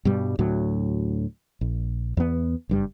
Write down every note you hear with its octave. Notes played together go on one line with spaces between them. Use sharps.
G2 B2 G3
D2 A2 F#3
A#1
E2 B3
F#1 G2 G3